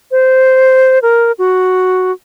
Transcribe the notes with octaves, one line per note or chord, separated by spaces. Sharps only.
C5
A#4
F#4